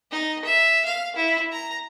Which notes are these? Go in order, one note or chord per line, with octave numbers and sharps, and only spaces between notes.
D#4
E5
F5
E4
A#5